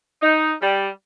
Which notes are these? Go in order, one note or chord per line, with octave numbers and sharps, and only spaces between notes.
D#4
G3